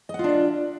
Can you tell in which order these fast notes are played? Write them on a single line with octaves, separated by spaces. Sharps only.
D#5 F#5 F4 D4 E5